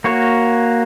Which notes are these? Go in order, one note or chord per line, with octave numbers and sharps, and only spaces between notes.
A#3 F#4 C#5